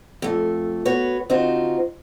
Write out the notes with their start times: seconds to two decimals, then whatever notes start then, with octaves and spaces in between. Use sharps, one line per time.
0.22 F2 A3
0.85 B3 F#4 C#5
1.29 D3 C4 D#4 F4 F#4 C5